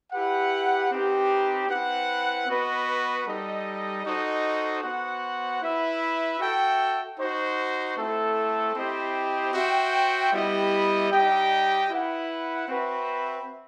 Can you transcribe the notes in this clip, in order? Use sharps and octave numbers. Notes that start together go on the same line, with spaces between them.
E4 G4 B4 F#5
C4 D#4 G4 B4
C4 E4 B4 F#5
B3 F#4 B4 D#5
G3 D#4 A4 D#5
D#4 F#4 A4 C5 D#5
B3 F#4 C5 F#5
E4 B4 E5
F#4 A4 E5 G5
D#4 F#4 C5
A3 C4 E4 A4
C4 E4 G4 C5 D#5
F#4 C5 E5 G5
G3 B3 E4 G4 D#5
G3 D#4 G4 D#5 G5
E4 B4 F#5
C4 F#4 B4 E5